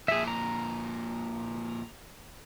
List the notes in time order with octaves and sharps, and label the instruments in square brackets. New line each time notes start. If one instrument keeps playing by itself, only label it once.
[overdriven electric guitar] F2 A#2 [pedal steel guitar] G#4 E5
[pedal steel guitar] A#5